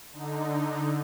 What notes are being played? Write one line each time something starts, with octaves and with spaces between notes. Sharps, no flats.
D3 D#4